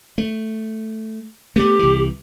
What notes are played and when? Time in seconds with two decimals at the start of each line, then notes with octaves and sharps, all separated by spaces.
0.18 A3
1.56 A3 B3 G4
1.79 C2 E3